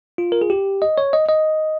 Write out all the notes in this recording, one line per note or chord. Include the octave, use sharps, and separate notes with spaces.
F4
A#4
G#4
G4
D#5
C#5
D#5
D#5